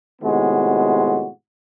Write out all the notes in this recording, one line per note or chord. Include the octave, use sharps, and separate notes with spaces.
A2 C3 D#3 G#3 B3 F#4